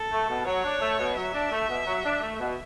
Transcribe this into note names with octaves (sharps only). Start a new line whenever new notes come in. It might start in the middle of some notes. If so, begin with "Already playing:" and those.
Already playing: A4
A3
B2
F#3 C#5
D4
A3
B2
F#3 E5
D4
A3
B2
F#3
D4
A3
B2